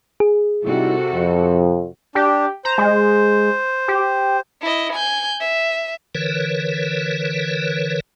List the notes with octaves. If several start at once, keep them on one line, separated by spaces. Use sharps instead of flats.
G#4
C3 G3 D#4 E4 F#4 A4
F2
D4 G4
C5 A#5
G#3
G4
E4 D#5
G#5 G6
E5
D3 E3 A#4 B4 C#5